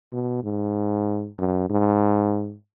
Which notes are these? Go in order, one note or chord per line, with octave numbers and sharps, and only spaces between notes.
B2
G#2
F#2
G#2